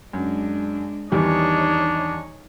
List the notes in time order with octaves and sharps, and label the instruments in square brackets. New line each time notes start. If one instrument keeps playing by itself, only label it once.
[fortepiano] F#2 [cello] G#3 D4
[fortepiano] E2 D#3 G3 [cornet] D4 [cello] D#4 C#5